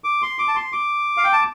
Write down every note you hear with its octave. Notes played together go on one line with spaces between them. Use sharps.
D6
C6
D6
A5
C6
D6
F5
G5
A5